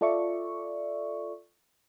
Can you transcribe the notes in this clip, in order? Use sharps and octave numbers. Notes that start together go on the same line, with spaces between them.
F4 A4 D5 E5 C#6